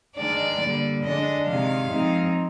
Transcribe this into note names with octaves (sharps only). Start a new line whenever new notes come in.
D#3 G#3 D4 D5
D3 G3 A#3
D3 G#3 D4 D#5
C3 D#3 G#3 F5
F3 G#3 C4 D#4